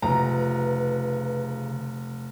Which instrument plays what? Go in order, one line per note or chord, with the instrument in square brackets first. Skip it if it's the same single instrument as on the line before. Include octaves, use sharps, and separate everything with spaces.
[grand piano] F1 [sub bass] C#3 [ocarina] B4 [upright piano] A#5